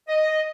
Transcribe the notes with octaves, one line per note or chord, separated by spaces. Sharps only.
D#5